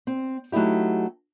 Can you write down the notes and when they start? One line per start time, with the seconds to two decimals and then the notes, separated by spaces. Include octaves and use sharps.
0.07 C4
0.52 F#3 A3 D#4 E4 G4